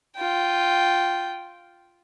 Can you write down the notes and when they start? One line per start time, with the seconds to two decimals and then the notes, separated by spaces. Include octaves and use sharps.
0.16 F4 G5